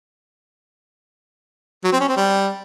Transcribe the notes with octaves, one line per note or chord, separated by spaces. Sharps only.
F#3
C4
C#4
C4
G3